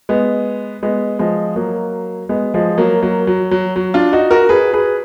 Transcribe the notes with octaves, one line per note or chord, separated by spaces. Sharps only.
G#3 B3
G#3 B3
F3 G#3
F#3 A#3
G#3 B3
F3 G#3
F#3 A#3
F#3 A#3
F#3
F#3
F#3
D4 F4
D#4 F#4
F#4 A#4
G#4 B4
G#4 B4